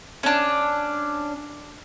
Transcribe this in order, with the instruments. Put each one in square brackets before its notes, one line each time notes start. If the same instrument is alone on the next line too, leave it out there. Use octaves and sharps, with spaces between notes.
[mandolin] C#4 D4